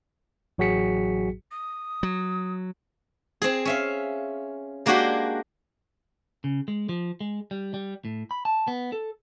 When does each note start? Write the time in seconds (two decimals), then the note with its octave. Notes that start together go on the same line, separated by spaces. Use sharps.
0.58 A1 F#3 F#4 G#4 B6 C#7
1.51 D#6
2.03 F#3
3.42 C4 G#4
3.65 C#4 E5 F5
4.86 G#3 A#3 D4 F#4 G4 C6
6.44 C#3
6.68 G#3
6.89 F3
7.21 G#3
7.51 G3
7.74 G3
8.05 A2
8.31 B5
8.45 A5
8.68 B3
8.92 A4